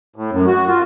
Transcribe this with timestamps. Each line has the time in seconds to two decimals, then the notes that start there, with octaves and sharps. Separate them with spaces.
0.16 A2
0.32 F#2
0.46 F#4
0.68 F4